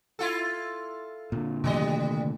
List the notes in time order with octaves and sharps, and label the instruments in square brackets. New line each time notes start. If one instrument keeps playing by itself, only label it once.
[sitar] E4 F4 A4
[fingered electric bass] A#2 D3
[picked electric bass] C3 D#3 A3 [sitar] F3 G3 D#5